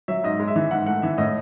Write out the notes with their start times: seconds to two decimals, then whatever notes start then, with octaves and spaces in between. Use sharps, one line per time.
0.08 F#3 E5
0.24 G#2 D#5
0.40 G#3
0.47 E5
0.56 E3
0.71 G#2 F#5
0.86 A3 F#5
1.02 E3 E5
1.18 A2 D#5